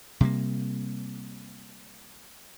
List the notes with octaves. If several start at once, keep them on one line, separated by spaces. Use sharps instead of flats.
C3 G3 A3 A#3